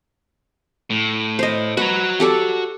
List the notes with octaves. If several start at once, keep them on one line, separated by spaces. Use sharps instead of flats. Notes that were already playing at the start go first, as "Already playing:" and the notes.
A2
C5 D#5
F#4 B4 A#5
G4 A4 D5